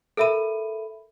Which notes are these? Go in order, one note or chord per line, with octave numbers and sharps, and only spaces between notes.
A4 A#4 E5 B5 D#7